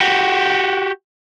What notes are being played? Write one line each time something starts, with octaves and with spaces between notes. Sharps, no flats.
F#4 G4